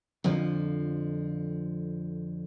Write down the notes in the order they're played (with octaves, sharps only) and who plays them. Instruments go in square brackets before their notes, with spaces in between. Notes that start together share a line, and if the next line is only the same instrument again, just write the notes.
[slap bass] F2 D3 F3